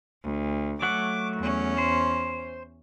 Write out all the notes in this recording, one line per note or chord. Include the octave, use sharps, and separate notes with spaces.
D2
F#3 A3 F#5 D6
E2 C#4
C5